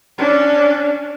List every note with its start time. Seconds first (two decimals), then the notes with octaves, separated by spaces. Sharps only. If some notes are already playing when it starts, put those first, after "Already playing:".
0.18 C#4 D4